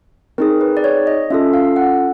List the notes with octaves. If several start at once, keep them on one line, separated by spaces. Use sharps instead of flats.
C4 D#4 G#4 A#4
B4
D5
C#5
D#5
C#4 F4 A4 E5
F5
F#5